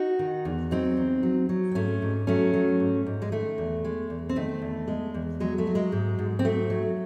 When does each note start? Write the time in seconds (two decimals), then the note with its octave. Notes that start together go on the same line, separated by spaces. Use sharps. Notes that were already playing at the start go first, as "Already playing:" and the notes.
Already playing: D#4 F#4
0.19 D#3
0.45 E2
0.71 F#3 C4 D#4
0.97 E2
1.23 F#3
1.49 F#3
1.71 C4
1.75 G#2 A3 C#4
2.02 G#2
2.27 F#3 A3 C#4
2.53 F#3
2.80 G#2
3.06 G#2
3.22 G#3
3.32 D#3 A3
3.58 E2
3.85 G#3
4.10 E2
4.29 C4
4.36 D#3 A3
4.62 E2
4.88 G#3
5.14 E2
5.40 F#3 G#3
5.58 A3
5.67 F#3
5.75 G#3
5.92 G#2
6.19 G#2
6.39 C4
6.45 F#3 A3
6.70 F#3